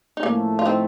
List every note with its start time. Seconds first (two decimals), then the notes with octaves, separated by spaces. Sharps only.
0.17 D#4
0.23 A2 F3 A3 A#3 C#4
0.59 F4
0.65 C4 D#4